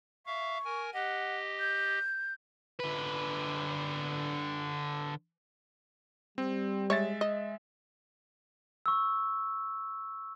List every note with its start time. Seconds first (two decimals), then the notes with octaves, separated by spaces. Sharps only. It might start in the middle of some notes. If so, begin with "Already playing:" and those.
0.26 E5 F5 C#6
0.65 A#4 G#5
0.94 G4 D#5 F#5
1.59 G6
2.79 D3 B4
6.38 G3 C4
6.90 G#3 C#5 E5 A6
7.21 D#5
8.86 C#6 E6